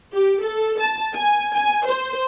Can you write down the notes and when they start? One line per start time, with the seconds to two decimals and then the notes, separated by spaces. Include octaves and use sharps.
0.13 G4
0.43 A4
0.79 A5
1.14 G#5
1.54 G#5
1.85 C5